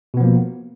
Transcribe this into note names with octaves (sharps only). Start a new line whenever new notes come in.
B2 F3 A#3 B3